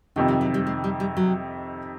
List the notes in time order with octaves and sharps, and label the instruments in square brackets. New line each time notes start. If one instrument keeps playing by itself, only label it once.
[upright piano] F2 C3 D#3 [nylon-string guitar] A3
[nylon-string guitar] G3
F#3
G3
G#3
G3
G3
F#3